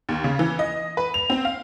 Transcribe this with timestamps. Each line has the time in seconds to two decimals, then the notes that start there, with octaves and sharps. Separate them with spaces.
0.09 D#2
0.24 C#3
0.39 E3
0.59 D#5
0.97 B4
1.14 F7
1.30 C4
1.45 F5